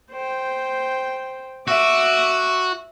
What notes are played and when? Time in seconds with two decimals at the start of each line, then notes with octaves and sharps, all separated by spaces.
0.12 C5 G5
1.68 F#4 E5 D6